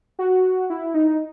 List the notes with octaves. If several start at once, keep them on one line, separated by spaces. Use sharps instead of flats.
F#4
E4
D#4